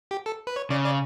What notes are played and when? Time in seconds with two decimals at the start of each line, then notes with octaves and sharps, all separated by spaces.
0.11 G4
0.26 A4
0.47 B4
0.56 C#5
0.70 C#3 D5
0.85 D5